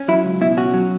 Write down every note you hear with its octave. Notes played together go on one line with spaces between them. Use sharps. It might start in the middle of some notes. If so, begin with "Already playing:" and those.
Already playing: C#4
F#3 E4
C#2
B2 E4
C#4 F#4
F#3